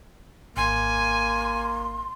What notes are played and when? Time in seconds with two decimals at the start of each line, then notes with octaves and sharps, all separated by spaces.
0.57 G#1 A#3 G#5 C6